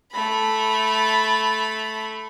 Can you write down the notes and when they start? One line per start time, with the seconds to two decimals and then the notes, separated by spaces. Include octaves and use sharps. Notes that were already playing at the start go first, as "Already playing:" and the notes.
0.12 A3 B5